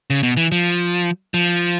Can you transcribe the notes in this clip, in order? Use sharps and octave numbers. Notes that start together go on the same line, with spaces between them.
C#3
B2
E3
F3
F3